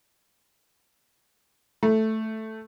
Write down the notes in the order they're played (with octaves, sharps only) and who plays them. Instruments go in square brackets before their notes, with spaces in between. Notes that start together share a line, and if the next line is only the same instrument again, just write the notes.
[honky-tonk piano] A3